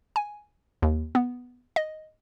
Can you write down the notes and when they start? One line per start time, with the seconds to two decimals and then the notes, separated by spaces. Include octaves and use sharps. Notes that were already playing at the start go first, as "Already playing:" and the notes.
0.16 G#5
0.82 D#2
1.15 B3
1.76 D#5